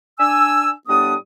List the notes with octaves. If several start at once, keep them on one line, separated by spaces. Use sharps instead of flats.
D4 G#5 E6
A2 G3 B3 D4 D#6